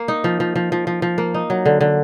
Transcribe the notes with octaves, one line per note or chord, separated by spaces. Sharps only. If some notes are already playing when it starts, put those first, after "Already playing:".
Already playing: A#3
D#4
F3
F3
F3
F3
F3
F3
A#3
D#4
F#3
D3
D3